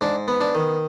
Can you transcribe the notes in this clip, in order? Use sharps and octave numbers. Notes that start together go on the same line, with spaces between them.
G#2 D4
B3
D4
D#3